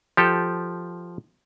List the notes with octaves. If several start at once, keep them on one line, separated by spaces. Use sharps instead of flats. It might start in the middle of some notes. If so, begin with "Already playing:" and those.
F3 G4 A4